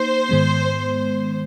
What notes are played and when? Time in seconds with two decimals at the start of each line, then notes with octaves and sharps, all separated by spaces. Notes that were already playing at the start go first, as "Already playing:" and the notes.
Already playing: A#3 D#4 C5
0.29 G#2 D#3 G#3 B3